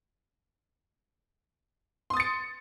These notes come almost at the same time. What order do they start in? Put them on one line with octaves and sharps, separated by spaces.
C6 D#6 A6 C#7